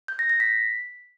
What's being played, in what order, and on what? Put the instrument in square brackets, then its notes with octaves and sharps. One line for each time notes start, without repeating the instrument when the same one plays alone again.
[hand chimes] G6
A#6
A#6
B6